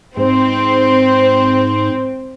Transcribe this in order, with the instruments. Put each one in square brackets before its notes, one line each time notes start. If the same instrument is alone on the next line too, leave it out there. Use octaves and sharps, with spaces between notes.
[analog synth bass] G#2 [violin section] C4